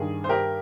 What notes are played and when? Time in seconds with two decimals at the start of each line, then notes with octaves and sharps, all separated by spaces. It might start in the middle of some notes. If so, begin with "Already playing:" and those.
Already playing: G2 D#3 G#4
0.24 C5
0.29 G4 A#4